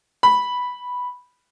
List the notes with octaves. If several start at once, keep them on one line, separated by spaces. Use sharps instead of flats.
B5